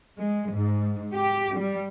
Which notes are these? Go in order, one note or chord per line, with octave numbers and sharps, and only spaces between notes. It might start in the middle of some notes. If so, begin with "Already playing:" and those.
G#3
G#2
G4
G3